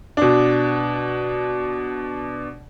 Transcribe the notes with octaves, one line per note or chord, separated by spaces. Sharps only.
B2 D4